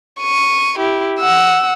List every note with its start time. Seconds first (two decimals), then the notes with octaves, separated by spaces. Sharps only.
0.20 C#6 D#7
0.79 E4 G4
1.20 F#5 E6